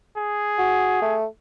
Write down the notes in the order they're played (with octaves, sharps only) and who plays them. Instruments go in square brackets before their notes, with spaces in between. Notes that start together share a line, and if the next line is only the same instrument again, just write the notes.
[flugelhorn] G#4
[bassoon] F#4
A3